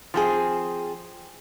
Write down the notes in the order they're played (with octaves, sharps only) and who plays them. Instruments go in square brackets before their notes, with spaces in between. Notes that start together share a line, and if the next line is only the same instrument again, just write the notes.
[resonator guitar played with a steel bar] F3 C4 G#4